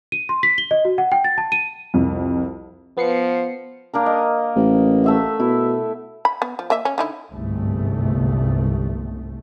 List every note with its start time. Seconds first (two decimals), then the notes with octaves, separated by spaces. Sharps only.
0.12 D#7
0.29 C6
0.43 B6
0.58 G7
0.71 D#5
0.85 F#4
0.98 F#5
1.12 G5
1.24 A6
1.38 A5
1.52 D#7
1.94 C2 F2
2.97 F3 B3 C7 C#7
3.93 A#3 D4 A#4
4.06 D#5
4.56 A1
5.04 A3 E5 F#5
5.40 B2 E4
6.25 B5
6.42 B3
6.59 F3
6.70 A#3 D#5 E5
6.85 C#4
6.98 D3 D#4 E4
7.32 G1 C2 G#2 A3